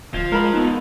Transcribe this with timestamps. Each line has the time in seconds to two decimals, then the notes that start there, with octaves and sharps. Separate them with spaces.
0.14 D1 F3 G#6
0.32 G#3 A#4 B5
0.53 B3 D#4 F#6